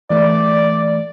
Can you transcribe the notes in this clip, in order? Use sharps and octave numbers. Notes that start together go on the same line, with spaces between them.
E3 A3 D5